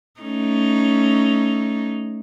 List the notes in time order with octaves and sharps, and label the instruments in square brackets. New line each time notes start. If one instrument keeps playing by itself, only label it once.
[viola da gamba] A3 C#4 D#4